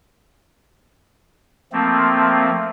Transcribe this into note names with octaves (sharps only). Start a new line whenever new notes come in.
F3 A3 A#3 C4